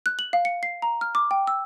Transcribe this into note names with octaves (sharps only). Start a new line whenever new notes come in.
F#6
F#7
F5
C#7
C7
A#5
F6
D6
G5
E6